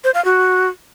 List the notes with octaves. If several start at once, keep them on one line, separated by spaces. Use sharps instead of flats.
C5
F5
F#4